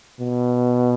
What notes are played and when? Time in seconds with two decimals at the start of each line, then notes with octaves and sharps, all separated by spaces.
0.20 B2